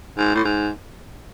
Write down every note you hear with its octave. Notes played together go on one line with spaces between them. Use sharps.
G#2
A2
G#2